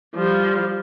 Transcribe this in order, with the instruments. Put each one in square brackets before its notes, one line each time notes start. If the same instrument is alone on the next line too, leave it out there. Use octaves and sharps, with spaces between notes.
[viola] F3 G3